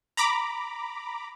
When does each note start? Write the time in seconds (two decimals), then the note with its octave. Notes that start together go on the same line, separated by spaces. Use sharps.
0.17 A#5 B5 D6